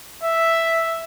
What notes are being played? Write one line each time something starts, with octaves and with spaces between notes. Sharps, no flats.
E5